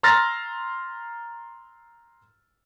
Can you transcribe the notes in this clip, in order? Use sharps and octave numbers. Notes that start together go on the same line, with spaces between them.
A#5 C6 E6 F6 A6 A#6